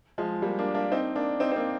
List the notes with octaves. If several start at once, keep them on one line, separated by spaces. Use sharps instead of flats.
F3 G#3
G3 A#3
A#3 D4
A#3 D4
C4 D#4
A#3 D4
C4 D#4
C4
A#3 D4